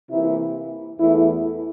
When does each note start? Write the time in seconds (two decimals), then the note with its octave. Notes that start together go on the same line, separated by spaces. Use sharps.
0.10 C3 E3 A#3 E4
1.00 E2 E3 A3 E4